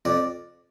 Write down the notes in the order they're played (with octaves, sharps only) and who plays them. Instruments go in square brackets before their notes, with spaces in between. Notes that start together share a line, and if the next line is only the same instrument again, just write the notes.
[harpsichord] F2 D5